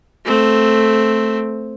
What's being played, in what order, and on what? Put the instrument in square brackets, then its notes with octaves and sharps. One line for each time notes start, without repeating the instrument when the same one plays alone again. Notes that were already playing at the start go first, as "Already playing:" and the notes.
[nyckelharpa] A3 C4